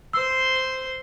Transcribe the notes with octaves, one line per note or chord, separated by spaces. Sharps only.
C5 C6 E6